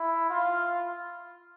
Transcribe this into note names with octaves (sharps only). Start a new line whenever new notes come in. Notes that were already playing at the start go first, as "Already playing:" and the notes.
Already playing: E4
F4